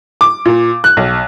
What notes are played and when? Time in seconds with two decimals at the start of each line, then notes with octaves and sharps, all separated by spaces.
0.21 D6
0.46 A#2
0.84 F#6
0.97 B1